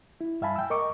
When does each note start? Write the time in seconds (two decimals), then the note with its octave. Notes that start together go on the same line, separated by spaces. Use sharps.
0.21 E4
0.42 G2 E5 F5 G#5 A5 B5
0.56 G5 E6
0.70 A#4 D#5 C#6 D6